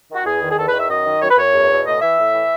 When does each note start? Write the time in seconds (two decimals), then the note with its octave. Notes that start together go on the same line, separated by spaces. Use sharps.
0.10 D#3
0.15 F#4
0.25 E2 G#4
0.42 D#3
0.51 G#4
0.58 E2 A4
0.68 B4
0.73 D#3
0.79 E5
0.89 F#2 D#5
1.06 D#3
1.22 F#2 C#5
1.31 B4
1.37 F#2 C#5
1.54 E2
1.71 B2
1.86 A2 D#5
2.02 E3 E5
2.19 A2
2.34 E3